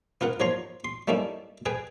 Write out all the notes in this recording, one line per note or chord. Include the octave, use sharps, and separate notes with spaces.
B3 F4 A#4 F#5
D#2 F3 C#5 A#5 C6
C6
G3 A3 A#3 C#4 D#4 E4
G#4 B4 G5